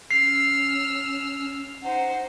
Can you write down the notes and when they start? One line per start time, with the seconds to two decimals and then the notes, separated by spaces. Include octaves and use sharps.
0.11 C#4 E6 F6 C7
1.83 D#4 C5 F#5